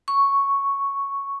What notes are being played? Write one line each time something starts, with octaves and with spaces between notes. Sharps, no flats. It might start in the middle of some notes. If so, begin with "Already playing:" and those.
C#6